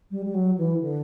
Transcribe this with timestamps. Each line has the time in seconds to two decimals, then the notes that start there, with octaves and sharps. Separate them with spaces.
0.11 G3
0.25 G3
0.34 F#3
0.58 E3
0.81 D3